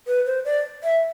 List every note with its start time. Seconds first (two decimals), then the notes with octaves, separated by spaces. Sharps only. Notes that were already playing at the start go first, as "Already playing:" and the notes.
0.07 B4
0.26 C5
0.45 D5
0.84 E5